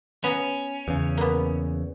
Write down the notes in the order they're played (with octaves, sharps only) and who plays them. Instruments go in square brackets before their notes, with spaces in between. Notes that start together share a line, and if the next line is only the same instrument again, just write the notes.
[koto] B3 A#5 [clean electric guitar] C#4
[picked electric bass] E2 C#3
[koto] A#3 B3